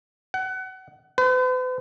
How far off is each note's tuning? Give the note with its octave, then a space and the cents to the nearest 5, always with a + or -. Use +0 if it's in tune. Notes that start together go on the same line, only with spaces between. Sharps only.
F#5 +25
B4 +45